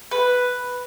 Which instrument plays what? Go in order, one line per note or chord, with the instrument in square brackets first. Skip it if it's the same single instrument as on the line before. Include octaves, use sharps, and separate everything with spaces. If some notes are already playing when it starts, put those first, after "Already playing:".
[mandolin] B4